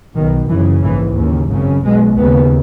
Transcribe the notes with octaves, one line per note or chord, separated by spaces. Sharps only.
B1 B2 D#3
F#1 F#2 C#3 E3
A#1 G#2 E3
D#2 C#3
G#1 F#2 C#3
B1 B2 G#3
D#2 C#3 B3